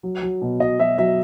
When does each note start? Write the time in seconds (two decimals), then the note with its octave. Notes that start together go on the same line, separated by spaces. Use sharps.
0.03 F#3
0.22 F#3
0.42 B2
0.60 B2 D#5
0.79 F#3 E5
0.98 F#3 E5